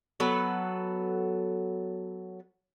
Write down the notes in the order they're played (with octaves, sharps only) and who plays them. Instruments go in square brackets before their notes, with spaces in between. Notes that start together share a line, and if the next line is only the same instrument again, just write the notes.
[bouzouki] F#3 B3 A4 B4